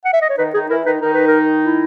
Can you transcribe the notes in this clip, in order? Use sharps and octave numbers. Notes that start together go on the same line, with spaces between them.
F#5
E5
D#5
C#5
D#3 D#4 B4
D#3 D#4 G#4
E3 E4 A#4
D#3 D#4 B4
D#3 D#4 A#4
B4
A#4
E4